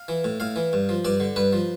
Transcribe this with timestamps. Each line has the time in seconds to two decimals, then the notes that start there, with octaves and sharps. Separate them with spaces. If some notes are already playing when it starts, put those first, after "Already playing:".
Already playing: F5
0.08 E3
0.24 A2
0.40 A2 F5
0.56 E3
0.73 G2
0.89 F3
1.05 G2 D5
1.20 D3
1.36 G2 B4
1.53 F3